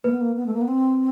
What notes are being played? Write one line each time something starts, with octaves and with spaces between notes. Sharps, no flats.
A#3 B4
B3
A#3
B3
A3
A#3
B3
C4